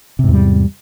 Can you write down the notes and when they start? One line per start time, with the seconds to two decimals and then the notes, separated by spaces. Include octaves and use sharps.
0.19 C3
0.24 G#2
0.29 E2
0.33 G3